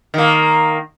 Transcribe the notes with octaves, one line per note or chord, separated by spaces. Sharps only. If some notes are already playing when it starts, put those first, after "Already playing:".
D#3 A#3